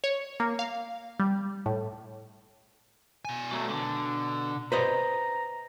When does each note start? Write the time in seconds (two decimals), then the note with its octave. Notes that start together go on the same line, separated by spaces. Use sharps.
0.04 C#5
0.40 A#3
0.59 F5
1.20 G3
1.66 A2
3.25 B2 G#5
3.52 F#3 A3
3.70 D3
4.72 B4 C5 D#5 A#5